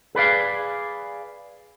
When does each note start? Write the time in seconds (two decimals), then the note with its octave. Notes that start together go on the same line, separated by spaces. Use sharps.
0.15 G#4 B4 D5 F5